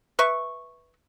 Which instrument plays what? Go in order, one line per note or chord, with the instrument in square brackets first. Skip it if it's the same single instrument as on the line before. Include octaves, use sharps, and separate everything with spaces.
[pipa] B4 E5 C#6